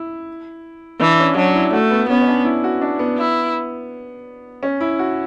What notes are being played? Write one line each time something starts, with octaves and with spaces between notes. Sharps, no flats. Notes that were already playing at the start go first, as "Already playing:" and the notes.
Already playing: E4
E3 D4
C#4
F#3 D4
E4
A3 F#4
B3
B3 C#4
C#4
D4
E4
F#4
D4
B3
E4
C#4
E4
F#4